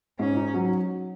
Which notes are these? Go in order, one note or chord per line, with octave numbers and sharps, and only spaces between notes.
G#2 C#4
D#4
F#3